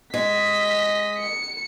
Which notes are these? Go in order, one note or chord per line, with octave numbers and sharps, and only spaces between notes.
G#3 D#5 B6
C#7